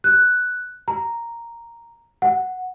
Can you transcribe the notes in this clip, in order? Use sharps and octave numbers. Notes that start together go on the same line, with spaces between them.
F#6
A#5
F#5